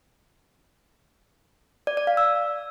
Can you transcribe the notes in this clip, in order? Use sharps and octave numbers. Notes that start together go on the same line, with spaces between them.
D5
D5
F5
E6